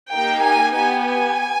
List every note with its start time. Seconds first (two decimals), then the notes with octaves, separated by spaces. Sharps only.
0.14 A#3 D#4 G4 G5
0.44 G#5
0.76 B3 G4 G#5
1.07 G#5